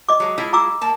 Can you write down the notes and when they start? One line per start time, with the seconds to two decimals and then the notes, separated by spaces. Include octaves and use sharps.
0.09 D#5 D6
0.20 F#3 G#3
0.38 G#3 E4 F4
0.53 A#5 D6 E6
0.81 A#3 A5